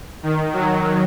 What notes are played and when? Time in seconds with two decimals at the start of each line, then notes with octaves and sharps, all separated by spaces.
0.23 D#3
0.53 F#3